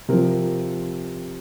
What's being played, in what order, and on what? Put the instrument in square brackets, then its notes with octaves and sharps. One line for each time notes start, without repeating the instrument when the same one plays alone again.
[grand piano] C3 F3 A#4